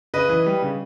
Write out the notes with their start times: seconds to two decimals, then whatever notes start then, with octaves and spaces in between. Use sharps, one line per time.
0.14 C#3 B4 D#5
0.29 E3
0.46 G3
0.62 C#3